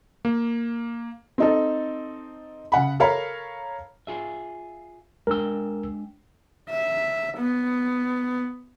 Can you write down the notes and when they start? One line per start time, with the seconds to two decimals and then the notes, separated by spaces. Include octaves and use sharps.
0.25 A#3
1.38 C4 D#4 A4
2.72 C#3 F#5 B5
3.00 A4 A#4 C#5 F5 A#5 B5
4.07 F4 G#4 E5
5.27 G#3 D4 A#4 G5 E6
6.69 E5
7.38 B3